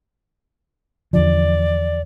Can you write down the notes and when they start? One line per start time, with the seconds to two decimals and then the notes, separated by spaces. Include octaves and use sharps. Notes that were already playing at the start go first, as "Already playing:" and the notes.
1.13 E2 D3 F3 D5